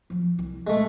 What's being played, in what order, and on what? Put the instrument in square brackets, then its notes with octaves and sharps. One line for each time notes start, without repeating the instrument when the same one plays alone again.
[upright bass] F3 F#3
C2 E4
[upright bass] A#1 [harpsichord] G#3 A3